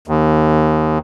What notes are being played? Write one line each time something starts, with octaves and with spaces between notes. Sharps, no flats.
D#2